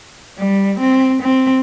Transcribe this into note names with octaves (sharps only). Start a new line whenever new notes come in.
G3
C4
C4